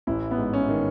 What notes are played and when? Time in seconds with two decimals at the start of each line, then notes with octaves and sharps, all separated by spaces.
0.07 A1 E4
0.31 B3
0.38 G#2
0.54 C#4
0.69 D#3